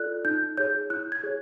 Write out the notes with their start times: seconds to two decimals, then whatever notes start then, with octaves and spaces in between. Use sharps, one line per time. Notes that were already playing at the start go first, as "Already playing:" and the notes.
Already playing: F4 A4 D5 F#6
0.25 D#4 G6
0.57 G#4 C#5 G6
0.90 E4 F#6
1.12 G#6
1.24 G#4 C#5